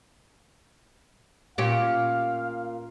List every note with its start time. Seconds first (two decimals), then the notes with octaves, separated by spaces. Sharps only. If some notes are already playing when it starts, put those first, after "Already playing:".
1.58 A#2 C#4 G4 F5